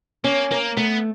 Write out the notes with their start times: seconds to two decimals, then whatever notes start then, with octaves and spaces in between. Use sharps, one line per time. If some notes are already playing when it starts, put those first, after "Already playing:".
0.24 A#3 C#4
0.51 A#3 A#4
0.77 A3 B3